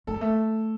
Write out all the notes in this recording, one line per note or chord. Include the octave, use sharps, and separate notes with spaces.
A3 A4
G3
A3